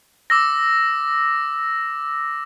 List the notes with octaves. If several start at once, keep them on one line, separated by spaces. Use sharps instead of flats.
D6 E6 A#6